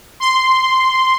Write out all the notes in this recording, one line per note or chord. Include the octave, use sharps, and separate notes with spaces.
C6